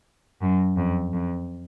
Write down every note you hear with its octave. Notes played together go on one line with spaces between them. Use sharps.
F#2
F2
F2